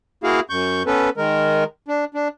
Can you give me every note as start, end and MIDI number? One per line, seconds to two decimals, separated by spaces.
0.24 0.40 58
0.24 0.40 64
0.24 0.40 66
0.24 0.40 68
0.24 0.40 77
0.50 0.83 42
0.50 0.83 85
0.50 0.83 91
0.86 1.10 59
0.86 1.10 61
0.86 1.10 69
0.86 1.10 71
1.17 1.64 51
1.17 1.64 56
1.17 1.64 70
1.88 2.05 62
2.14 2.28 62